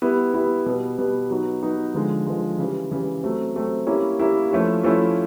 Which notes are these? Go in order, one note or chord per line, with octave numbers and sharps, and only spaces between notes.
G3 B3 E4
G3 B3 E4
B2 G3 B3
B2 G3 B3
F#3 B3 D#4 F#4
F#3 B3 D#4 F#4
D3 F3 G#3
D3 F3 G#3
C#3 E3 G3
C#3 E3 G3
F#3 A3 C4
F#3 A3 C4
G3 A#3 C#4 E4
G3 A#3 C#4 E4
F3 A3 C#4 E4
F3 A3 C#4 E4